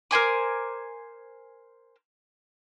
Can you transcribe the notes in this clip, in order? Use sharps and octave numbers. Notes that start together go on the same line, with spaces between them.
A#4 C5 G#5 D6